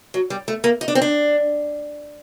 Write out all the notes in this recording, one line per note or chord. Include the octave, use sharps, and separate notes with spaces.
F#3
G3
A3
A#3
D#4
D4
C4
D4